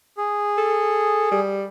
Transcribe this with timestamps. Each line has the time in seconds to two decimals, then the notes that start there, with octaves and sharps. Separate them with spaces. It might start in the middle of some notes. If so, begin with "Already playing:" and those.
0.17 G#4
0.58 A4
1.32 G3